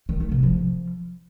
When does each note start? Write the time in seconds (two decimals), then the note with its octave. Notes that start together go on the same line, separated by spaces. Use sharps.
0.09 D#3
0.20 A3
0.32 C3
0.43 F3